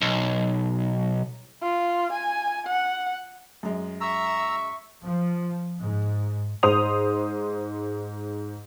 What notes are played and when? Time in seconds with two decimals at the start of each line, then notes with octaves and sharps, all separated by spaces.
0.01 B1
1.63 F4
2.13 G#5
2.67 F#5
3.63 F#2 G#3
4.01 E5 A#5 C#6 E6
5.02 F3
5.81 G#2
6.63 G#2 C5 C6 D#6 F7